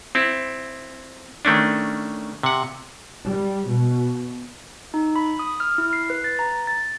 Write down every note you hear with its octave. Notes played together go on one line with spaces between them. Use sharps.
C4 E4
D#3 A3 C#4 D4
C3 F#5
G3
B2
D#4
B5
D#6
F6
E4
C7
B4
A6
A#5
A6